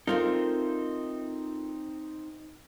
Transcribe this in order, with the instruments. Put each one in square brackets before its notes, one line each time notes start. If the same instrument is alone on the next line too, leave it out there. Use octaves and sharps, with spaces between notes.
[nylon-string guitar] A3 F4 A#4 [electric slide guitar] C4 D#4